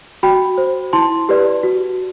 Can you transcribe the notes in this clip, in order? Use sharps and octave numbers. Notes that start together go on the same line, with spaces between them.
F#4 G5 B5
C5
E4 A5 C6
G4 B4 D5
F#4